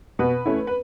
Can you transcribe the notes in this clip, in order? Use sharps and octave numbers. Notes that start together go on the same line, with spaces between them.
B2 B4
A3 C#4 E4
B4